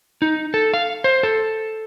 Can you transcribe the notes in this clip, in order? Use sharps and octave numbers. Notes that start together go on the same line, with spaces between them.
D#4
A4
F5
C5
A4